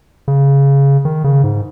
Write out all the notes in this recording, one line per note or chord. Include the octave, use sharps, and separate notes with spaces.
C#3
D#3
C#3
G#2